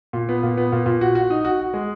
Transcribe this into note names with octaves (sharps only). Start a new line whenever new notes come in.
A#2
B3
A#2
B3
A#2
A#2
F#4
F#4
D#4
F#4
F#4
G#3